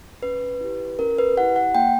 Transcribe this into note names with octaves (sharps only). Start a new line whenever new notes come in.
C#4 B4
E4 G4
C#4 A#4
B4
E4 G4 F#5
F#5
A#3 G5